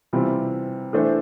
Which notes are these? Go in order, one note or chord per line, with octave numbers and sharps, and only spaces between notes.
C3 E3 G3 C4 F4
E3 A3 D4 A4 C5